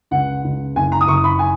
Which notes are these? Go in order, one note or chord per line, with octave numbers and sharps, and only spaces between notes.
C#2 F#5
C#2
F#1 G#5
A#5
D#6
F#1 C#6
B5
G#5